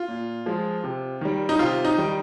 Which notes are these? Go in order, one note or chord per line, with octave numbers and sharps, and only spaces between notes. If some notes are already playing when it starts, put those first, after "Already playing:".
Already playing: F4
A#2
F3 G#3
C3
D#3 G3
D#4
C3 F4
D#4
D#3 G3